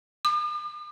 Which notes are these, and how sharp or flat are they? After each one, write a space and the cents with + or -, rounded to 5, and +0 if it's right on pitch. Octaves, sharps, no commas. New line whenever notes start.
D6 +45